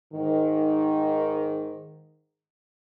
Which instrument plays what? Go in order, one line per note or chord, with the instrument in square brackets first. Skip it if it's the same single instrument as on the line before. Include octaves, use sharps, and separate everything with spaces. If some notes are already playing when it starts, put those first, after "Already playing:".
[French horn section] G#2 D#3